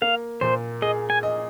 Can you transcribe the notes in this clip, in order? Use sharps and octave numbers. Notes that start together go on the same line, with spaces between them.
A#3 F5
A#2 C5
G#4 D#5
G#5
D#5